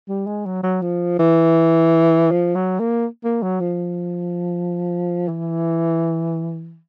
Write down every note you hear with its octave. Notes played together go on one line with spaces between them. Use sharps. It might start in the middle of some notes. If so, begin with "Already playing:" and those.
G3
G#3
F#3
F#3
F3
E3
F3
F#3
A#3
A#3
F#3
F3
E3